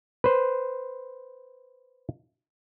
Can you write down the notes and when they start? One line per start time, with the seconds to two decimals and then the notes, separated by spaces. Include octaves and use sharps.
0.24 B4 C5